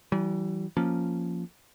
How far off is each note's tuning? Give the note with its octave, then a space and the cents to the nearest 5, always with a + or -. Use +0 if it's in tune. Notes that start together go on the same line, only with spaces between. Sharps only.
E3 +0 G3 -40
F3 +0 A#3 +0 C#4 +0